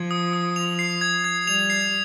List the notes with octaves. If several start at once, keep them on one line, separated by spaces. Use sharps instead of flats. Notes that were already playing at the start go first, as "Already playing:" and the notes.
Already playing: F3 G#6
D#6
D#6
F7
C7
G#6
G#6
G3 F7
C7